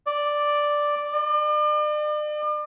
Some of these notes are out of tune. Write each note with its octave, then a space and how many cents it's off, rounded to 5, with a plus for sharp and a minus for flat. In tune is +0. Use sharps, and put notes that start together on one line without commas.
D5 +0
D5 +40